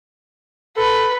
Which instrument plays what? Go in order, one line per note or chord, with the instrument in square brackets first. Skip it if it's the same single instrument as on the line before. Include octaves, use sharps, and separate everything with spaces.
[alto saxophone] A4 [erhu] B4